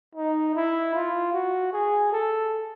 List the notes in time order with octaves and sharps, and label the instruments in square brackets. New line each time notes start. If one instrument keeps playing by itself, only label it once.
[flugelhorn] D#4
E4
F4
F#4
G#4
A4